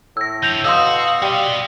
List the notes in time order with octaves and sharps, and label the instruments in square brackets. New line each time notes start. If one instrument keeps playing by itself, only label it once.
[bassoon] A2 [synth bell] E6 A#6
[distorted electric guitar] F2 D3 [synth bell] G6 F7
[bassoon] B2 [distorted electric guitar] F#4 [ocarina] F5 [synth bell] C6 D#6 E6
[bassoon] G3 [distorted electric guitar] F#4 D#5